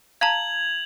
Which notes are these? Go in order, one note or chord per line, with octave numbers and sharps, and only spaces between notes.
F5 A5 A#5 G#6 F7 F#7